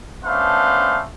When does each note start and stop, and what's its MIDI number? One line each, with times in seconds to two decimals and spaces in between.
0.24 1.02 57
0.24 1.02 59
0.24 1.02 61
0.24 1.02 62
0.24 1.02 72
0.24 1.02 77